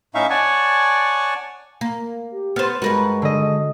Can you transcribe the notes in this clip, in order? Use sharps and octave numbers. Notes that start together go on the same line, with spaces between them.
A2 C#4 D#4 E5 F5 C#6
C#5 D5 F#5 G#5 A5 C#6
A#3
G4
B3 C5 F6 A6
G2 G#3 F#4 A#4 B4
D3 D#5